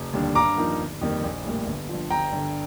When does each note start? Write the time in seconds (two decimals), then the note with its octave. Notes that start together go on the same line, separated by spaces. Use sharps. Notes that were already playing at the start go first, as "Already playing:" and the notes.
Already playing: F1
0.13 D#2 D3 G3 D4
0.35 G2 A#5 D6
0.58 F3 A#3 D#4
0.79 G1
1.01 F2 D#3 G3 A#3
1.23 A#1
1.44 A2 G3 A#3
1.66 G1
1.89 G2 F3
2.10 G1 G5 A#5
2.32 G2 D3